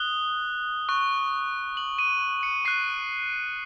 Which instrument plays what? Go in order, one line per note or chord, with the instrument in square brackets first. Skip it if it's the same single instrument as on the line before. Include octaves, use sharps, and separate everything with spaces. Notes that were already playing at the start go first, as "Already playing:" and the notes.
Already playing: [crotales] D#6 F#6 G7
C#6 F#6
F#7
D#7
C#7
C#6 F#6 C7